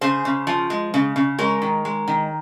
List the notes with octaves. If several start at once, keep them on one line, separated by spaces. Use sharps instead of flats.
C#3 G#4 C5
C#3
F3
G#3
C#3
C#3
G#3 A#4 C#5
D#3
G#3
D#3